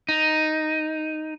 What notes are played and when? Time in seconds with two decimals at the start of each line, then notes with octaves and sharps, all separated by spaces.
0.09 D#4